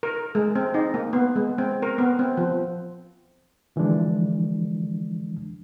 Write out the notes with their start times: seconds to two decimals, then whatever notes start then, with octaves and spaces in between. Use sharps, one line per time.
0.03 A#4
0.35 G#3
0.55 C4
0.74 D#4
0.94 A#3
1.13 B3
1.36 G#3
1.58 C4
1.83 A#4
1.98 B3
2.19 C4
2.37 F3
3.76 D3 E3 F3 G#3 D4